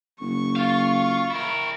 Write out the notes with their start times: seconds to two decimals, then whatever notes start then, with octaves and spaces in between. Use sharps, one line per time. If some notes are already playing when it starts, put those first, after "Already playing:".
0.20 F#1 C#6
0.56 F4 F5
1.31 E4 A#4